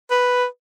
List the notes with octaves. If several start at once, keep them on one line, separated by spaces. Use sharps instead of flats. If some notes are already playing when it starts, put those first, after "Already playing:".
B4